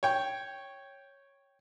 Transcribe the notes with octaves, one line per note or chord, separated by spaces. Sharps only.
C#5 G5 C#6